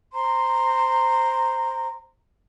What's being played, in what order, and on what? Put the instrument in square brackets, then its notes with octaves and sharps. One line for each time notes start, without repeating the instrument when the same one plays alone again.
[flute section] C5 A#5 C6